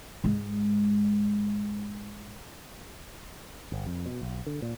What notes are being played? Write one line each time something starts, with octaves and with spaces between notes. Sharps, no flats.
G#2 G#3
G1
F2
B2
B1
D3
A#2